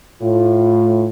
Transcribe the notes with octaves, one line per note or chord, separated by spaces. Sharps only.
A2 F4